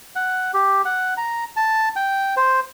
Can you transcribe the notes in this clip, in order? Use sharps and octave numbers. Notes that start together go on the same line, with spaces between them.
F#5
G4
F#5
A#5
A5
G5
C5